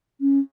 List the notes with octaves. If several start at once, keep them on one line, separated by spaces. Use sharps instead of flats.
C#4